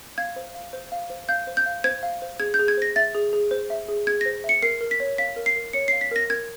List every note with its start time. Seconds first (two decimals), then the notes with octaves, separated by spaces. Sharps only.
0.18 F5 G#6
0.36 C5
0.54 F5
0.73 C5
0.92 F5
1.10 C5
1.29 F5 G6
1.47 C5
1.57 G6
1.66 F5
1.84 C5 G#6
2.03 F5
2.22 C5
2.40 G#4 G#6
2.54 G6
2.59 G#4
2.68 G#6
2.77 C5 A#6
2.96 E5 A6
3.15 G#4
3.33 G#4
3.51 C5
3.70 E5
3.88 G#4
4.07 G#4 G#6
4.21 A#6
4.26 C5
4.44 E5
4.49 C#7
4.62 A#4 C7
4.81 A#4
4.91 B6
5.00 C#5
5.18 F5 B6
5.36 A#4
5.46 C7
5.56 A#4
5.73 C#5 C#7
5.88 C7
5.92 F5
6.01 B6
6.11 A#4 A#6
6.30 A#4 G#6